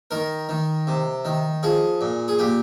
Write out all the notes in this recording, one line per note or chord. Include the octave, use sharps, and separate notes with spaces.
D#3 A#4
D#3
C3
D#3
F3 G#4
A#2
G#4
A#2 G4